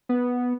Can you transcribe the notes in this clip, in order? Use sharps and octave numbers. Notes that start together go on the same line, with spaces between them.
B3